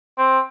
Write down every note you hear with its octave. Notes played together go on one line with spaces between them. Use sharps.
C4